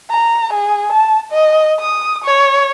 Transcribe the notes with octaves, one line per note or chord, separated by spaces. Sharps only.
A#5
G#4
A5
D#5
D#6
C#5